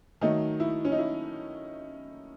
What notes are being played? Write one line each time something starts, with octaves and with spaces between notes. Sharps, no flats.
D#3 F#3 A3 D#4
E4
C#4
D#4
E4